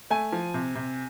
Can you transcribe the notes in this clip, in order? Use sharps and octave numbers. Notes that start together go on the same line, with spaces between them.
A3 G#5
F3
C3
C3